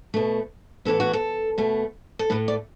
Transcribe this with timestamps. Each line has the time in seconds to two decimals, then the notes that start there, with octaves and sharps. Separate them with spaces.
0.14 B2 A3
0.85 A2 E3 B3 A4
1.00 F#4
1.13 A4
1.58 B2 A3
2.19 A4
2.30 A2 A3 B4
2.48 D5